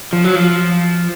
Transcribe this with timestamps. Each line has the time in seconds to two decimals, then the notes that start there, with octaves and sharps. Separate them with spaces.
0.13 F3
0.24 F#3
0.36 F3